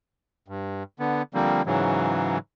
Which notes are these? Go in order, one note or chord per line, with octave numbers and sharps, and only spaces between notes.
G2
D3 B3
D3 F3 G3 A#3 C4
G#2 C#3 E3 F#3